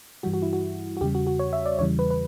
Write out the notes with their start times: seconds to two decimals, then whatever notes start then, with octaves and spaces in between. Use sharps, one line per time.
0.23 G2 E3 G3 F#4
0.33 F#4
0.42 E4
0.53 F#4
0.97 F#4
1.01 E2 C#3 G3 G4
1.15 F#4
1.27 F#4
1.39 C#5
1.53 E5
1.66 D5
1.79 E2 C#3 E3 G3 C#5
1.99 B4
2.10 B4